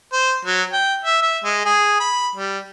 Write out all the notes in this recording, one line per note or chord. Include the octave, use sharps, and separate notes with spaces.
C5
F#3
G5
E5
E5
G#3
G#4
B5
G3